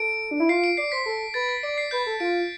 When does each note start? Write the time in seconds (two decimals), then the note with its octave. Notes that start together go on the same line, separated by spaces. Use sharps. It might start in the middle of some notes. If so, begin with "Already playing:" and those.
Already playing: A4 D7
0.31 D4
0.40 E4
0.49 F4 C7
0.64 D7
0.77 D5 C7
0.92 C5 B6
1.06 A4
1.34 B4 A6
1.49 B6
1.63 D5 D7
1.78 C7
1.91 B4 G6
2.06 A4
2.20 F4 D7